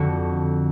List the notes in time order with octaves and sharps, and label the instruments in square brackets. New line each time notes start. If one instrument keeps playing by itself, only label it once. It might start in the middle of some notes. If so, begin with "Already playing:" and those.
Already playing: [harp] F2 D3 F#4